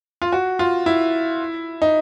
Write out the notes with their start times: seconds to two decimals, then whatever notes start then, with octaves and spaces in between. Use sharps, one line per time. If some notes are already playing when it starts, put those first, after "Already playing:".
0.22 F4
0.32 F#4
0.59 F4
0.86 E4
1.82 D#4